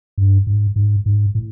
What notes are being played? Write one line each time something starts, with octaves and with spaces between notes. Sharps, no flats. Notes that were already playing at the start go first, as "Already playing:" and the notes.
G2
G#2
G#2
G#2
A2